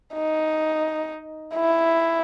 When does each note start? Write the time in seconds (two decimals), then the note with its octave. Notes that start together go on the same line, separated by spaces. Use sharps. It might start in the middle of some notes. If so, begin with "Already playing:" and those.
0.14 D#4
1.55 E4